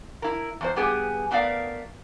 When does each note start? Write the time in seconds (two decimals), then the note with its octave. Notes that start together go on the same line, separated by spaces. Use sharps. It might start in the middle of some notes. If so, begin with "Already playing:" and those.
0.22 E4 A#4
0.61 E2 G#3 C5
0.76 G2 B3 G4 G#4 G#5
1.31 A3 B3 A#4 D5 F5